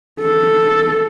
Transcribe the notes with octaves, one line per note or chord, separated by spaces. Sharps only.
A4